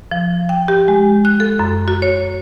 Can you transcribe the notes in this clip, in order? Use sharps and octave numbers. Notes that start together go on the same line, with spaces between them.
F3
G5
G4
G#3
F#6
A4
F#2
F#4
C#5